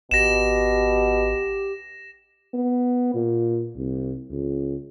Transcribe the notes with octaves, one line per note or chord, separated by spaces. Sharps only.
G#1 B2 G4 A#6 E7
B3
A#2
C2
C#2